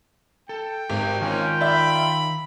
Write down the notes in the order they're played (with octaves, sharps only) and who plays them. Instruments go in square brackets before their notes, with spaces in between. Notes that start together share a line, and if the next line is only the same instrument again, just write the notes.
[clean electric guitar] A4 [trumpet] G5
[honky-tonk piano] G#1 [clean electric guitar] G4
[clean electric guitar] D#3 A#4 G#5 [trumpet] C#4 [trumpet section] F4 G5
[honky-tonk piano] D5 E5 [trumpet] B5